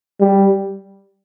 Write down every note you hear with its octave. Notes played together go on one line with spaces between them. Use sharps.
G3